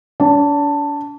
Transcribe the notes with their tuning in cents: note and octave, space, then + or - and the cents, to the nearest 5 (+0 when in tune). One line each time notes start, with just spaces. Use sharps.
D4 -45 A5 +10